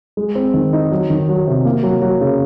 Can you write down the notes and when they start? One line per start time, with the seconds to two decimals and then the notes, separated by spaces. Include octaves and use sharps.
0.17 G#3
0.35 C4
0.54 D#3
0.73 D#4
0.92 F#3
1.10 D#3
1.29 F#3
1.47 C3
1.65 A#3
1.83 F#3
2.02 F#3
2.21 C#3